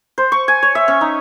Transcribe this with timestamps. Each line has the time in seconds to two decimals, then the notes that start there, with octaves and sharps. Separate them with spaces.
0.18 C5
0.32 C#6
0.48 G#5
0.63 C#5
0.75 E5
0.88 C#4
1.01 D#4